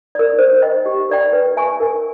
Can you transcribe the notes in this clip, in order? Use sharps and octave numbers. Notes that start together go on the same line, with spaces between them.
A#4 D5
C5
D#5 G5
G4
A#4 D5 G5
B4
E5 G#5 C#6
A#4